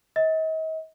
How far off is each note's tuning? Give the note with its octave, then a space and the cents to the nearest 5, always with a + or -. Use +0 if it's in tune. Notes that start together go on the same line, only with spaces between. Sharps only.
D#5 +40